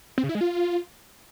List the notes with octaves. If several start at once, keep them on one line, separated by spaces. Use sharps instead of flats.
C4
C#3
E4
G#3
F4